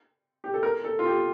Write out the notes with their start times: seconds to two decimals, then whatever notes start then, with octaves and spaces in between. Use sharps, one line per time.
0.44 G4
0.54 A4
0.63 A#4
0.84 A4
0.99 F4
1.05 G4